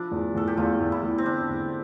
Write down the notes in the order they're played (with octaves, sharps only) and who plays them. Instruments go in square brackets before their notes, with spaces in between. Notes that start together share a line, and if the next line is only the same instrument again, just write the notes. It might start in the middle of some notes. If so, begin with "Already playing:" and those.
Already playing: [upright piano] F3 [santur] D4 E4
[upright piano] E2
[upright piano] E2 [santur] A4
[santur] G4
[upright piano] E2 [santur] F4
[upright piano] E2
[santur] E4
[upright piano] E2
[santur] C4
[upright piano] D3 [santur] D4
[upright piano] E2